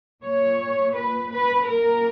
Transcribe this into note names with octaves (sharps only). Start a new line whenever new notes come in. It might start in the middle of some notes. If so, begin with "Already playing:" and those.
A#2 C#5
B4
B4
A#2 A#4